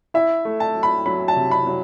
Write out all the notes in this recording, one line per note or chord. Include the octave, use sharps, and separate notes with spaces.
E4 E5
A3
A5
F#3
B5
F#3 B5
A5
C3
B5
F#3